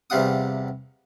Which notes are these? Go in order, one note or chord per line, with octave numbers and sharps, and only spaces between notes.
E2 C3 G3 F4 F#5 D#6